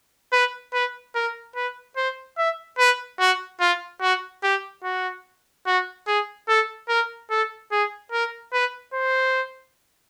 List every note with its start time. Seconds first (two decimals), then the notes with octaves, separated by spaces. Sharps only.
0.32 B4
0.73 B4
1.15 A#4
1.55 B4
1.96 C5
2.38 E5
2.79 B4
3.20 F#4
3.60 F4
4.01 F#4
4.43 G4
4.84 F#4
5.66 F#4
6.07 G#4
6.48 A4
6.89 A#4
7.30 A4
7.72 G#4
8.12 A#4
8.53 B4
8.94 C5